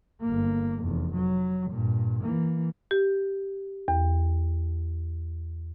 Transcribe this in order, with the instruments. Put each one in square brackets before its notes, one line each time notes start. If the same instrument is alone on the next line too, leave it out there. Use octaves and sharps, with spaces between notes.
[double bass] G1 A#3
F1 E2
F#3
G2 A#2
E3 A#3
[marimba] G4
E2